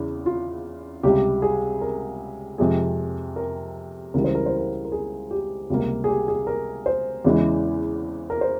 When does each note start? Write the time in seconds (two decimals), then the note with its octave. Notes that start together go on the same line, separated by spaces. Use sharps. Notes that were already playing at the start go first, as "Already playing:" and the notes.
Already playing: E2 C#3 E3
0.26 F4
1.03 C#2 C3 G3 G4
1.42 G#4
1.81 A#4
2.58 F2 C3 F3 G#3 G#4
3.36 A#4
4.14 C#2 C#3 E3 G3 A#4
4.24 C5
4.35 A#4
4.46 C5
4.57 A#4
4.85 A#4
4.92 G#4
5.31 G4
5.70 C#2 C3 G3 A#3
6.04 G#4
6.08 G4
6.28 G#4
6.47 A#4
6.86 C5
7.25 E2 C#3 E3 G#3
8.30 A#4
8.41 C5